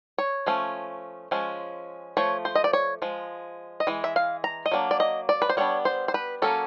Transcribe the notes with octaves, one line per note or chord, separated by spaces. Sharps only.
C#5
F3 A3 C#4
F3 G#3 C#4
F3 A3 C#5
C5
D#5
D5
C#5
F3 G#3
D#5
E3 G#3
E5
F5
A#5
D#5
F#3 A#3 D4
D5
D#5
D5
B4
C5
G3 B3 D4 C#5
C5
C5
B4
F#3 A#3 C#4 A4